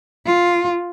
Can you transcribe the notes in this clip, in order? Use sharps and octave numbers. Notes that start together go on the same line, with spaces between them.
F4